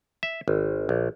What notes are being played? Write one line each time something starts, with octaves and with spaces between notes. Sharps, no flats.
E5
G#1
A#1